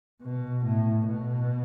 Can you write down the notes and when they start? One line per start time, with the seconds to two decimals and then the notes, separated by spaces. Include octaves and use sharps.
0.22 B2
0.65 A2
1.08 B2